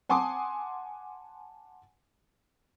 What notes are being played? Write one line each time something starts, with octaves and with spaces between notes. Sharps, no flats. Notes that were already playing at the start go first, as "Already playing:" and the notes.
F#5 G#5 A5 C6 D6 D#6